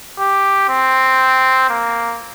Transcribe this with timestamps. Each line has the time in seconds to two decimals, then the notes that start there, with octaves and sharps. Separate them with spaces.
0.19 G4
0.69 C4
1.70 A#3